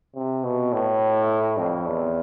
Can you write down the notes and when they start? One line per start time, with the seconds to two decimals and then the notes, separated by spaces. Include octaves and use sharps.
0.16 C3
0.44 B2
0.73 A2
1.58 F2
1.86 E2